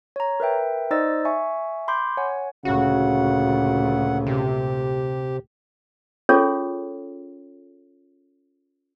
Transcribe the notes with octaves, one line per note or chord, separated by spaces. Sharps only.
C#5 A#5
A#4 B4 E5 G5
D#4 C5 D5 D#5 E6 A6
E5 G#5 C#6
B5 C6 D6 G6
C#5 F#5 G#5
D2 A#2 C#3 F#4 F#5
C3 G4
C#4 F4 G#4 A4 C#5